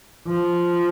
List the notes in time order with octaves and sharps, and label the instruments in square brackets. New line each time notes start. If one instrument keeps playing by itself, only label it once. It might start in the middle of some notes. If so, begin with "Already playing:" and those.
[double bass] F3